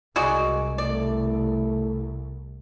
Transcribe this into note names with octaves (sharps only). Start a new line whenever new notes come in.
C2 G#3 F#4 D5
A3 E4 D5